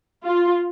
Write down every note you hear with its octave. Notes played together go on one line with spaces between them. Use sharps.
F4